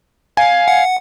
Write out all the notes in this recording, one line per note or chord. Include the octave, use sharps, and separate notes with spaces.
F5 G#5
F#5